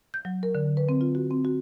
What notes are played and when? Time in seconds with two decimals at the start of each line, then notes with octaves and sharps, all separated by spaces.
0.14 G6
0.25 F#3
0.43 A#4
0.55 D3
0.77 B4
0.89 C4
1.01 F4
1.15 F#4
1.31 C4
1.45 F#4